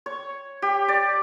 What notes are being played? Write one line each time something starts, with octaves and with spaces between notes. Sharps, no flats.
C#5
G4
D5